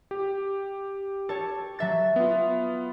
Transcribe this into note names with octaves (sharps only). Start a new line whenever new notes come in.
G4
A4 C#5
F#3 E5 A6
B3 F4